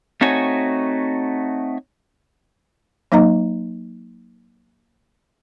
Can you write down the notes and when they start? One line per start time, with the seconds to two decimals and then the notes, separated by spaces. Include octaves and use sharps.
0.21 A3 C4 D#4 F#4 C#5 G#5
3.12 F#3 A#3 D#4 D#5 A#5